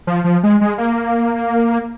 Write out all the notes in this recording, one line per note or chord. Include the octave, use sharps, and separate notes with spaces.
F3
F3
G#3
G#3
A#3